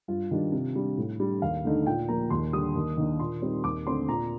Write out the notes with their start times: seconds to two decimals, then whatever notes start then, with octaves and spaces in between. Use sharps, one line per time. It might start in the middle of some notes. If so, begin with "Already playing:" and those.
0.08 G2 F4
0.31 D#3 G3 D4
0.52 C3
0.75 G3 D4
0.97 A2
1.20 G3 D4
1.42 D#2 F5
1.64 D3 A3 D#4
1.86 A#2 G5
2.08 F3 A#3 A#5
2.30 D#2 C6
2.53 D3 G3 D#6
2.75 D#2
2.97 D#3 A#3 D4
3.20 A#2 C6
3.42 G3 C4 D#4
3.64 D#2 D6
3.86 D3 A3 C4 C6
4.09 A#2 A#5